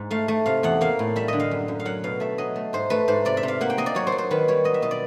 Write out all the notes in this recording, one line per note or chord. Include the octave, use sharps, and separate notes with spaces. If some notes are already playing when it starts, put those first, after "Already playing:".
Already playing: G#2
A3 F5
A3
C3 F5
E2 F#5
A#3 F5
A2
G3 E5
D3 D#5
F5
F#2
F#2
F5
F#3 F#5
B2 F5
A3 E5
F#3 D#5
A3
G#2 C5
A3 B4
G#2 C5
C3 D5
E5
C3
F5
A#3 F#5
G5
A#3 D#5
D5
F#3 C#5
C5
F#3
C5
D#3 B4
G3 C#5
F#3 D#5
E5
B2 D#5
D5